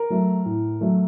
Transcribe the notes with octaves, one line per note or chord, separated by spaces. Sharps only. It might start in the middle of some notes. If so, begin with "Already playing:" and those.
Already playing: A#4
F#3 A3
A2
F#3 A3